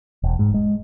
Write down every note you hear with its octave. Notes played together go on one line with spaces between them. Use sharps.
E1
G#2
G#3